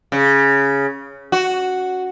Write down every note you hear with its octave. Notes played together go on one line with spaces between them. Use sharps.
C#3
F#4